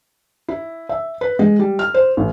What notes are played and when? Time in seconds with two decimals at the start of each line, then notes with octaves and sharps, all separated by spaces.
0.48 E4
0.89 E5
1.21 B4
1.39 G#3
1.59 G3
1.79 F6
1.94 C5
2.17 A1